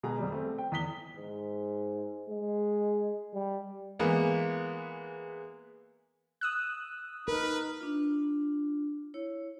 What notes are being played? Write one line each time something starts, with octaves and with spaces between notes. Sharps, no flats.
B2 G#3 G#4 A#5
F2 G3
A3 C4
G5
E2 D#6 B6 G7
G#2
G#3
G3
E3 G#3 A#3 B3
D#6 E6 F#6
D#4 A#4 B4
D4 F4
E4 C#5